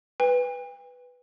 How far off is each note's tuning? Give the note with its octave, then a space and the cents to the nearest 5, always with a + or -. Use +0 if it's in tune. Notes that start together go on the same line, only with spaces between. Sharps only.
B4 +0 G5 +40